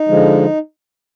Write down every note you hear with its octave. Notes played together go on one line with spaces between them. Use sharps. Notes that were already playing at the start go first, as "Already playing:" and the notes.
Already playing: D#4
D3 F3 G#3